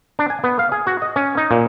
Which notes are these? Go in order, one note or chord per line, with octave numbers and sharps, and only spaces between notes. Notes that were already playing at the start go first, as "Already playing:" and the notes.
D4
G#5
B3
F5
G#4
F#4
D#5
C#4
D#4
A#2